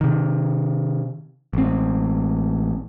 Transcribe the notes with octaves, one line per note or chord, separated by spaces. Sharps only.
C3 D#3
A1 C4